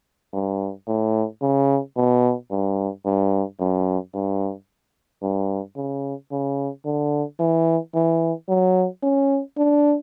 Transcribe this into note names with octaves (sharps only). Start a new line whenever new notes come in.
G2
A2
C#3
B2
G2
G2
F#2
G2
G2
C#3
C#3
D3
E3
E3
F#3
C#4
D4